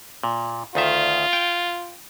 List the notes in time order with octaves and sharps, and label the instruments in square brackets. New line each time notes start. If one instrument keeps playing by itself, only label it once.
[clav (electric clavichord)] A#2
[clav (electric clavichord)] D2 D#3 E5 [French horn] F4
[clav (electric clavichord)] G5